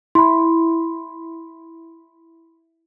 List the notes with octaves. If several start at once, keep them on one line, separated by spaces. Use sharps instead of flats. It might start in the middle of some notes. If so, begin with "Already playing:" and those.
E4 B5 C6